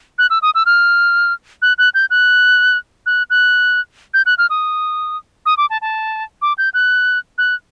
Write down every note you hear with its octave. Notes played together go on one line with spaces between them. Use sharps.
F#6
E6
D#6
E6
F6
F#6
F#6
G6
F#6
F#6
F#6
G6
F#6
F6
D#6
D#6
D6
A5
A5
D6
G6
F#6
F#6